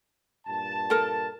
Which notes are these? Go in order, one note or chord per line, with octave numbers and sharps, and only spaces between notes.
G2 A#2 A5
A4 A#4